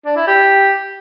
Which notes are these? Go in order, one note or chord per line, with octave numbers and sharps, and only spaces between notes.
D4
E4
G4